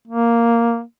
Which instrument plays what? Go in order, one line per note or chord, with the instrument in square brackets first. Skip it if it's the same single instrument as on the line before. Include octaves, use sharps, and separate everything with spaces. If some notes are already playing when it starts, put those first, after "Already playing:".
[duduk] A#3